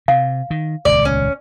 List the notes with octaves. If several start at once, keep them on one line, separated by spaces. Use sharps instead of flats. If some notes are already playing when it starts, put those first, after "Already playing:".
C3 F5
D#3
D#1 C#2 D5
C#4